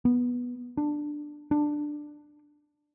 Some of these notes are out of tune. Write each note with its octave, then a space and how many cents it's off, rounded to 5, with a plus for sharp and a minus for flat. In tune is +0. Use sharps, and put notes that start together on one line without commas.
B3 -10
D4 +10
D4 +10